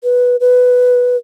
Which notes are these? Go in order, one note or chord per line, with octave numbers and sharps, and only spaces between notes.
B4
B4